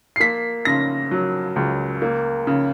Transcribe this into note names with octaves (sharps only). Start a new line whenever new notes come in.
C7
A#3 B6
C#3 A#6
F#3
C#2
A#3
C#3